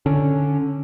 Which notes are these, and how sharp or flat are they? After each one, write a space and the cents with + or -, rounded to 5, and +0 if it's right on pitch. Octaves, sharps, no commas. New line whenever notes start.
D3 +0 C#4 +0